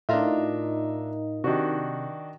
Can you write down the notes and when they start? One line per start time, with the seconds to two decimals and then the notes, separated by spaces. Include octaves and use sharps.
0.09 A2 D4 D#4 F4 A#4 D#5 E5 A#5
1.44 C3 D#3 D4 F#4